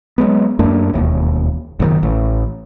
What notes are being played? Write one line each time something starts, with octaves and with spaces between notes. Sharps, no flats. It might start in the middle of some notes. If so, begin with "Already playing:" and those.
F#3 G#3 B3
F#2 A3 A#3 D4
E1 D#2
F#1 A#2 D#3
A1